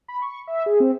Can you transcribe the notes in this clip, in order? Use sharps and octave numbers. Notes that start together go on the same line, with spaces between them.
B5
C#6
E5
G#4
C4